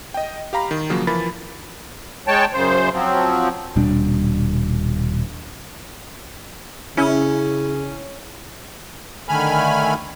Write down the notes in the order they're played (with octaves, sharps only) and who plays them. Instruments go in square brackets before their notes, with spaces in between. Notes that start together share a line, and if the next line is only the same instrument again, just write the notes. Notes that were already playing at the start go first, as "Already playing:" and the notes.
[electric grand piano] D#5 G5
G4 F5 A#5 B5
D#3
C#3 F3 F#3 A#3
E3 F3 A#4 B5 A6
[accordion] G#3 C#5 G5 A5
F#2 C#3 C5
F3 F#3 C4
[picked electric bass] D#1 B2 G3 D4
[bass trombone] C#3 [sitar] C#4 [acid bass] E4
[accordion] D3 D#3 A3 G#5 B5 F6